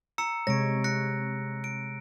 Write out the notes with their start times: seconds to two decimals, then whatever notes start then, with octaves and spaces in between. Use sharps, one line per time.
0.18 A#5 E6 C#7
0.47 C3 G#3 C#5 A#6 D7
0.84 F#6 A#6 C#7
1.64 D7